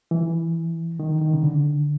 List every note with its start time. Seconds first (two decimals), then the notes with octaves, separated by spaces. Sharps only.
0.11 E3
1.00 D#3
1.21 D#3
1.33 C#3
1.43 D3